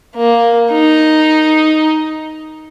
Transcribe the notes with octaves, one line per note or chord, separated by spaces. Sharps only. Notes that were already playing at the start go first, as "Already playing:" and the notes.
A#3
D#4